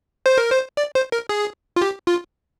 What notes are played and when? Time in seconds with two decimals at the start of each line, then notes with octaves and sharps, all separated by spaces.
0.26 C5
0.38 A#4
0.50 C5
0.77 D5
0.95 C5
1.12 A#4
1.29 G#4
1.76 F4
1.81 G4
2.07 F4